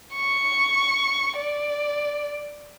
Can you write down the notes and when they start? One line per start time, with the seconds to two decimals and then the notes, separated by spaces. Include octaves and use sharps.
0.15 C#6
1.39 D5